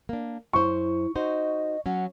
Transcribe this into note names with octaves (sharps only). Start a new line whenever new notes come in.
A#3 D4
F#2 E4 C5 C#6
D#4 F#4 C5 D#5
F#3 C#4 F#5